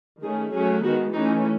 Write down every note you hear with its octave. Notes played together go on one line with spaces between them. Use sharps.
D#3 A3 C#4 G#4
F#3 A3 C#4 G#4
D#3 G#3 B3 F#4
E3 A3 C#4 D#4